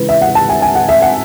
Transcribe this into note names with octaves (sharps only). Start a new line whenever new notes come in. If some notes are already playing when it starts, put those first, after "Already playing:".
Already playing: C#3 E3 G#3 B4
E5
F#5
A5
G#5
G#5
F#5
E5
F#5